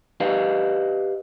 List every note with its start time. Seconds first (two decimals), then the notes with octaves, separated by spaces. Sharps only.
0.20 G4 B4 D#5 F5